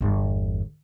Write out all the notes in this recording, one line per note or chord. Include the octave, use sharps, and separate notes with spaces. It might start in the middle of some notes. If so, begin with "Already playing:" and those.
G1 E2